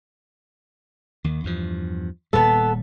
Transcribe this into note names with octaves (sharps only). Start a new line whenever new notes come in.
D#2 D#3
E2 G2 F3
D#1 A#2 G3 B3 A4